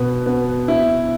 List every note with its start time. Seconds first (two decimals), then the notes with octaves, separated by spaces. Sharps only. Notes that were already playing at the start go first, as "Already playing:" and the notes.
Already playing: B2 B3
0.26 B3
0.68 E4